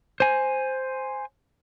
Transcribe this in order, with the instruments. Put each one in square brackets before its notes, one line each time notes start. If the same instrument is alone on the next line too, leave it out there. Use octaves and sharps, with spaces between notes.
[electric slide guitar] C5 G#5